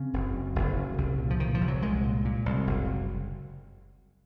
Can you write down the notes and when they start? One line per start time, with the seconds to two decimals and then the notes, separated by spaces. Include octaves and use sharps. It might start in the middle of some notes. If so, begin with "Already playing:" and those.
Already playing: C#3 C4
0.13 F#1
0.34 F#2
0.56 F#1
0.77 C#3
0.98 C2
1.19 A#2
1.30 F3
1.40 A#2 D#3
1.55 F3
1.61 C2
1.68 F#3
1.82 C2 G#3
2.04 A#2
2.25 A#2
2.46 C2
2.67 F#1